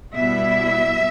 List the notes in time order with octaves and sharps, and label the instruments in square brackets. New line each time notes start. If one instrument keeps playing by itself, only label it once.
[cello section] B2 G3 B3 E4 E5